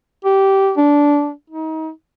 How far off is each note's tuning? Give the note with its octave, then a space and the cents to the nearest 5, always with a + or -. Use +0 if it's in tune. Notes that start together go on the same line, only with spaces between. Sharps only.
G4 -15
D4 -15
D#4 +30